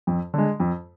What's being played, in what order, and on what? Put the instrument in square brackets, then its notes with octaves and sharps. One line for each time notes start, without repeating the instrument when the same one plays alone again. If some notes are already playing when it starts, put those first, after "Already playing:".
[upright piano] F2
D3 G#3
F2